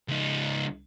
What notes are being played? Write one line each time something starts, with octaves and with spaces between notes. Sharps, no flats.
C#2 D#4